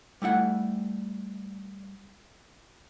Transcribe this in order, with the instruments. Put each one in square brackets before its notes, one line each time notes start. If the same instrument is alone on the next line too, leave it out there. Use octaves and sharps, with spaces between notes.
[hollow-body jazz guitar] G3 A3 E4 F#5